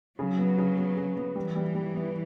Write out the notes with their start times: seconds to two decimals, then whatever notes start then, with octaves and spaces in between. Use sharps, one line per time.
0.19 C#3 F#3
0.38 B3
0.58 C#3
0.77 B3
0.97 C#3
1.16 B3
1.36 E3 G3
1.55 G3
1.75 G3
1.94 B3